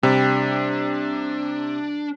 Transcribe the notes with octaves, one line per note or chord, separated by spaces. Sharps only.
C3 G3 D4